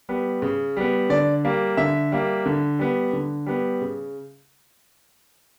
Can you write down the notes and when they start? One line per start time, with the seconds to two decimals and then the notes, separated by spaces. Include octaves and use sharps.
0.09 G3 B3
0.42 C#3
0.77 G3 B3
1.10 D3 D5
1.45 G3 A#3
1.77 D3 E5
2.12 G3 A#3
2.46 D3
2.79 G3 B3
3.13 D3
3.46 G3 B3
3.81 C#3